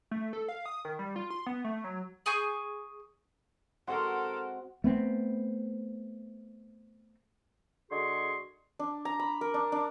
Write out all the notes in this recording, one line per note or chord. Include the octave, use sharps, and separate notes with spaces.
A3
A4
F5
D#6
D#3
G3
F4
C6
B3
A3
F#3
G#4 G#5 C#6 G6
G#3 C4 F#4 A4 A#4 F#5 C6
A3 B3 C4
D3 G#3 F#4 G#4 C6 C#6
D4
A#5
B5
A#4
D4
D4